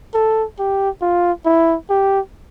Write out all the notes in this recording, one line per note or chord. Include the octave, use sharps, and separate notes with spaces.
A4
G4
F4
E4
G4